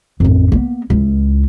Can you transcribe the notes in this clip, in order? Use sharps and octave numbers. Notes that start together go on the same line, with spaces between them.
A1 F2
A#3 B3
C#2 E4